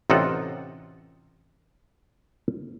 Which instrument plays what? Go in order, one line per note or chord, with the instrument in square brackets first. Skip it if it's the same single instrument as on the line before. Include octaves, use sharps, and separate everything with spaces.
[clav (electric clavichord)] A1 C3 D#4 F4 A4 F#5